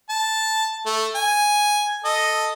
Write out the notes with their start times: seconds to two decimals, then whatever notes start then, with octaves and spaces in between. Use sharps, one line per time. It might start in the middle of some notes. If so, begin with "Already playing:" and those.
0.09 A5
0.86 A3
1.15 G#5
2.04 A4 D#5